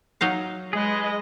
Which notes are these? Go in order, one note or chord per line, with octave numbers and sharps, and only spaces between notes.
F#3 D#4 F5
G#3 G#4 B4 D#5